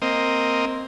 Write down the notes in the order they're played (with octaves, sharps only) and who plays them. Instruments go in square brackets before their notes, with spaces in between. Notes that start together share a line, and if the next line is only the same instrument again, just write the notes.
[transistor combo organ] A#3 C4 D#5